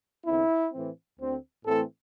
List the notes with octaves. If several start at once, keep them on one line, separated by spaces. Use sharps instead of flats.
E2 D3 C4 E4
A2 E3 C4
D2 D3 C4
A2 E3 A3 C4 A4